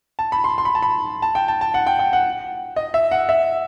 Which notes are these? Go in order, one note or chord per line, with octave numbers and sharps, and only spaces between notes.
A5
B5
C6
C6
B5
A5
B5
A5
G5
A5
A5
F#5
G5
G5
F#5
D#5
E5
F#5
E5